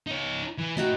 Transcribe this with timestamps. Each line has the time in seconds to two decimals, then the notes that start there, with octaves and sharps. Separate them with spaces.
0.07 D#4 C#5
0.58 E3
0.77 A2 D#4 F#4 G5